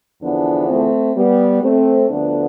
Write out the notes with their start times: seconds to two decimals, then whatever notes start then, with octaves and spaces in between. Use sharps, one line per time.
0.22 E2 D3 F3 B3 D4
0.69 A3 C4
1.16 G3 B3
1.63 A3 C4
2.10 D2 D3 F3 B3 D4